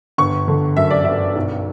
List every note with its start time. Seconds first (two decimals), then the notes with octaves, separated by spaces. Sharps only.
0.18 G1 C#6
0.48 D3
0.77 F#2 E5
0.90 D5
1.04 G1 E5
1.36 B1